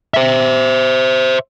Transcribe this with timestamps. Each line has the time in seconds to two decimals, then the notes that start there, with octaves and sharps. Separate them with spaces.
0.14 C5 E5